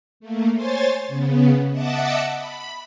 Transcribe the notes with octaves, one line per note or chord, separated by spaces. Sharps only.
A3 A#3
C5 C#5 G#5 C6 A6
C#3 B3
D#5 E5 F#5 A5 D6 E6
B5